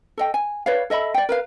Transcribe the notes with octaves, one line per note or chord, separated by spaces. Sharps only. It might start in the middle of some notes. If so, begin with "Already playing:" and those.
A4 D#5 G5
G#5
B4 C#5 D5 F5
A4 D#5 E5 B5
D5 G5
A#4 B4 F5